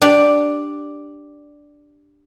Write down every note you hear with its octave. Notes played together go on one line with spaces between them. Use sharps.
D4 G4 D5